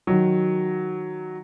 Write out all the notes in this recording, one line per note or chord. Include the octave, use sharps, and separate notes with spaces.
D#3 F#3